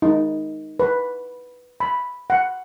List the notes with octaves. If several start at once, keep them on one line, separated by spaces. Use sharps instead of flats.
D#4
B4
B5
F#5